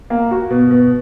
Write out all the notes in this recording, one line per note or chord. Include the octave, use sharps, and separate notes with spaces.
A#3
F#4
B2
B2